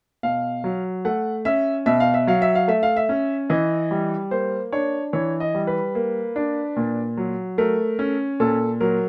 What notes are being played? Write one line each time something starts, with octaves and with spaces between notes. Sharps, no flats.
B2 F5
F#3
A3 F#5
C#4 E5
B2 E5
F5
E5
F#3 F5
E5
F5
A3 E5
F5
E5
C#4
E3 D#5
G3
A#3 C5
D4 C#5
E3 C#5
D#5
G3
B4
A#3
D4
A#2
F#3
A3 A#4
C#4
A#2 A4
F#3 A#4